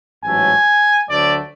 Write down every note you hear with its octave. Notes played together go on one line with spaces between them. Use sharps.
A1 G#2 F#3 A3 G#5
D2 D3 F#3 A3 D5